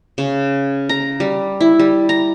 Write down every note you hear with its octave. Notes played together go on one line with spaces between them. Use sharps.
C#3
A#5
G3
E4
G3
A#5